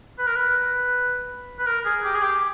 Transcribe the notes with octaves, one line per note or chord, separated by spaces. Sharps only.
B4
A#4
B4
B4
A#4
G#4
G4
G#4
G4